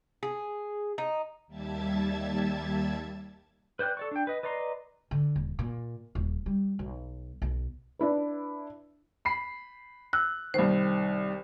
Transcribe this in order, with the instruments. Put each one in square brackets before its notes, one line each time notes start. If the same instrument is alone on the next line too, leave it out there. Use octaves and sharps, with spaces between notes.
[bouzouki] G#4
D#4
[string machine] D#2 G3 E5 A5 G#6 A6
[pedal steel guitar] B4 C5 D5 G5 F#6
A4 D5 C#6
D4 G5
B4 D#5
B4 D5 D#5 A#5 C6
[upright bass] D3
D#1
A#2
D#1
G3
B1
B1
[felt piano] D4 E4 B4
[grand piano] B5 C7
[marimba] E6 [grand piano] F#6
[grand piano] C2 D#3 [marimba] C5